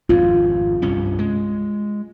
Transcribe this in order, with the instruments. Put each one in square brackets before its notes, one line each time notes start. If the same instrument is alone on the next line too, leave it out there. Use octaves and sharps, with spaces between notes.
[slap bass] G#1 F2 G#2 [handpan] F4
[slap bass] C2 G2 C#4
G#3